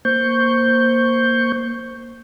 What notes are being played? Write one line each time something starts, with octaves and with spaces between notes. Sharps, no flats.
A#3 C5 C#6 G6